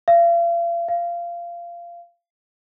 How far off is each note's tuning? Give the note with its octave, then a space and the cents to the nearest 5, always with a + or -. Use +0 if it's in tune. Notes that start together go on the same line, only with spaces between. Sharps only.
F5 -40
F5 -20